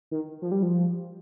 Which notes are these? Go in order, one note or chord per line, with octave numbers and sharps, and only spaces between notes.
D#3
F3
G3
F3